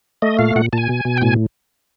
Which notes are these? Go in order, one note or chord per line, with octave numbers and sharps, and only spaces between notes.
A3 D#5
A#2 F5
A#2 F#5
A#2 G#5 A5
B2
B2
G5
A2 G#5